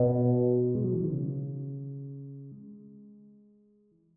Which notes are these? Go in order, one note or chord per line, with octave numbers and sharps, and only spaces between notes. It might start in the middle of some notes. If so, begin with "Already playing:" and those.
Already playing: B2
G#3
F#3
E3
D#3
C#3
G#3
E3